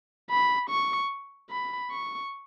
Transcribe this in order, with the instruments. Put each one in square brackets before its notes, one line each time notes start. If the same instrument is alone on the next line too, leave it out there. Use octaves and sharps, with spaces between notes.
[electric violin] B5
C#6
B5
C#6